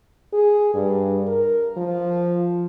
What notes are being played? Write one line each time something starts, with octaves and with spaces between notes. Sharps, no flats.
G#4
G2
A#4
F3